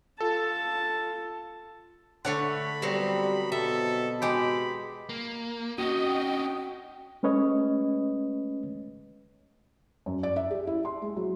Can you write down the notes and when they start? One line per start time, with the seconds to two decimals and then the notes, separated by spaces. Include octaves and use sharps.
0.20 F4 A4 A5
2.25 D3 A3 C#5 F#5 B5
2.82 F#3 G3 B3 C4
3.52 B2 A4 E5
4.22 G#3 G4 B5
5.09 A#3
5.78 C#4 D4 F#4 D#5 G5
7.23 G#3 A3 C#4 B4 C#5 D#5
10.06 F#2
10.23 D5
10.36 E5
10.51 G4
10.67 E4
10.85 C6
11.02 G#3
11.17 F#3